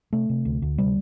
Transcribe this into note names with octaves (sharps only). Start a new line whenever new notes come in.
C3 A3
C3
D2
D2
C3 G3